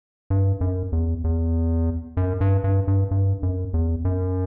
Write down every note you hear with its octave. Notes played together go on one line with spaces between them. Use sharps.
G2
F#2
E2
E2
F#2
G2
G2
G2
G2
F#2
E2
F#2